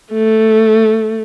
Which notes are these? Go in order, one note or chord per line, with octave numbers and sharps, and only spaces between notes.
A3